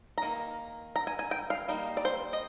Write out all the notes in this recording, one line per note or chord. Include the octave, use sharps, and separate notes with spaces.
A#5
D#3 A#3
A#5
G#5
G#5
G5
F5
G3 A#3 D#4
D5
C5
D#5